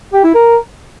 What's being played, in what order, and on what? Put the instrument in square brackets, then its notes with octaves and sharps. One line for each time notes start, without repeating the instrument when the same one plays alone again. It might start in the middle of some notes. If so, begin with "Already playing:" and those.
[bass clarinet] G4
E4
A#4